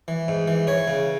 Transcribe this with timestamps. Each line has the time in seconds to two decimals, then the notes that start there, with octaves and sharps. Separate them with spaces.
0.08 E3
0.28 G#2
0.48 E3
0.67 E3 C#5
0.88 C#3